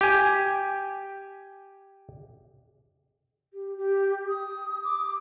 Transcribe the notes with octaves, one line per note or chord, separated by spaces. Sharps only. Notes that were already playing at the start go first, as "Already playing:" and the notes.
G4 G#5
G4
G4
D#6
D6